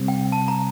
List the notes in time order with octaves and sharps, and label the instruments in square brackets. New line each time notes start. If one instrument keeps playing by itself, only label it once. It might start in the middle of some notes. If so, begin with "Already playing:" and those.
Already playing: [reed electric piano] C3 G3 C4
[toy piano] G5
A5
A#5